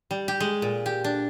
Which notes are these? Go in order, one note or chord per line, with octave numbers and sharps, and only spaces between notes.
G3
G4
G#3
A#2
G4
D4